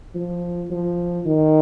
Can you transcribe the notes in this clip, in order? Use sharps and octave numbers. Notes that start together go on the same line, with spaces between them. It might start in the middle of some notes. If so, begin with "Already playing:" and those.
F3
F3
D#3